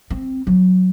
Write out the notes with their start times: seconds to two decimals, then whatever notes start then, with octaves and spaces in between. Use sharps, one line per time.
0.10 C4
0.47 F#3